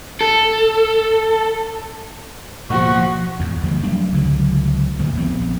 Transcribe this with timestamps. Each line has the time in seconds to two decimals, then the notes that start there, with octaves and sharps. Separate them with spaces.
0.21 A4
2.70 D1 B2 F3 A#3 F#4 C#6
3.39 E2 G#2
3.61 G1 F3 A#3
3.83 F#3 G3 A3 D4
4.12 C#2 D3 F#3
4.99 D2 A#2 D#3 E3
5.15 A#1 F3 B3 C4